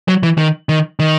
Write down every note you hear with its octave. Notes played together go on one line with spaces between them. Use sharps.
F#3
E3
D#3
D#3
D#3